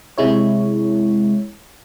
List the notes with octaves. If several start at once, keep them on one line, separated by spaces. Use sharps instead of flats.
C3 G#3 E4 C#5